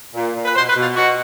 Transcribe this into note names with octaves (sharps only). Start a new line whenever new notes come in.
A#2
A#2
B4
B2 C5
B4
B2
F4
B2 F#4